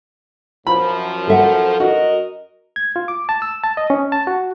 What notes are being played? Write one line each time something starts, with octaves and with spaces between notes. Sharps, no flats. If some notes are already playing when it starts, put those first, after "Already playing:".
F#2 F3 B5
A4 E5 F#5
F#2 F#4 A#4 D#5
G#6
F4
D6
A5
E6
A5
D#5
C#4
A5
F#4